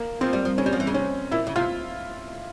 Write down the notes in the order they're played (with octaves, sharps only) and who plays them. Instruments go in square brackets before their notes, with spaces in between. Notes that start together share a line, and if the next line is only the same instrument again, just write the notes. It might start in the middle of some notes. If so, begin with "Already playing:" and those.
Already playing: [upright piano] A#3
[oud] F3 [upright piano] C4
[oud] G3
F3
[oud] C#3 [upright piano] C#4
[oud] G3
F3
E3
C#3
[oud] C3 [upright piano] C#4
[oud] A#2 [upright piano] E4
[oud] C#3
[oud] C3 [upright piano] F4